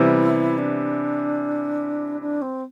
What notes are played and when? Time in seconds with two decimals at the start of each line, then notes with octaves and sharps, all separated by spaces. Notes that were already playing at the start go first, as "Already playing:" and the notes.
Already playing: C3 E3 G3 B3 E4
0.58 D4
2.21 D4
2.41 C4